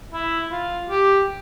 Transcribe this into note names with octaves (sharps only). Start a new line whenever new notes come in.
E4
F4
G4